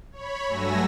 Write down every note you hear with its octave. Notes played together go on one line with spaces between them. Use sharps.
C#5 B5
G2 F#3 A3 G#5 E6 A#6